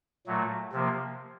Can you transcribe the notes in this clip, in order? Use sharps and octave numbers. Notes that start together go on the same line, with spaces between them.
A#2 F#3 A3
C3 F3 A#3